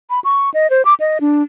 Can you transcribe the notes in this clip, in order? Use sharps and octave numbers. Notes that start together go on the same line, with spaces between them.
B5
C#6
D#5
C5
D6
D#5
D4